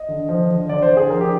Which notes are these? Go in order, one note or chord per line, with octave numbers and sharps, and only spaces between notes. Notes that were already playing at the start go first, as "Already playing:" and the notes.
Already playing: D#5
D3
F3
D3
D3 D5
C5
D3
G#4
F3 A#4
G4